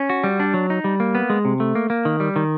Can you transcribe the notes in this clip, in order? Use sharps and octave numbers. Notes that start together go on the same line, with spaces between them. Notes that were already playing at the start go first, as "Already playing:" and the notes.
Already playing: C#4
F#4
G3
D4
F#3
D#4
G3
A#3
B3
G#3
C3
A3
A#3
A#3
D#3
G3
D#3